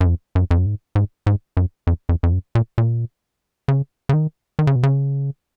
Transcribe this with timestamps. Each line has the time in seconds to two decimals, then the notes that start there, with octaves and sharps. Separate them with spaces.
0.01 F#2
0.06 F2
0.35 F#2
0.51 F2
0.58 F#2
0.66 G#2
0.95 G#2
1.26 G#2
1.57 F#2
1.87 F2
2.09 F2
2.23 F2
2.32 F#2
2.55 A#2
2.78 A#2
3.68 C#3
4.09 C#3
4.13 D#3
4.59 D#3
4.67 C#3
4.76 B2
4.83 C#3